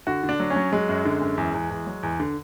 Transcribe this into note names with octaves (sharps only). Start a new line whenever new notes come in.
D3 F#4
D3
D4
F#3
C#4
F#3
F#3 G#3
F#2
D3
F#2
E2
E2
E2
F#3
E2
D3